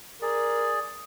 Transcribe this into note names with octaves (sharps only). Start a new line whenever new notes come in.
G#4 A#4 D5